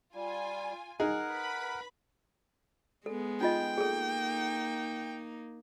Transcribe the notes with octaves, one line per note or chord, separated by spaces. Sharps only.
G3 F4 G#5
D#4 G#4 A#4 F#5
B4 B5
G#3 B3 A4
D#4 F4 D#5 G5
A#3 D#4 G#4 A4